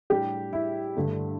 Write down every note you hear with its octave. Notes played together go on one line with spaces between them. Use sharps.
A2 G3 D4 G4
E4
G2 D3 A3 D4